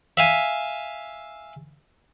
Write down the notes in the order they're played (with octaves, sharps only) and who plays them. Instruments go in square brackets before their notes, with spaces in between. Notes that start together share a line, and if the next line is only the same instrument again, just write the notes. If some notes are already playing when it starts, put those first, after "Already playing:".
[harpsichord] E5 F5 G#5